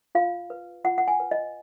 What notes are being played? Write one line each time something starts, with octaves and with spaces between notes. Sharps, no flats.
F4 F5
B4
F4 F#5
F#5
G#5
B4
D#5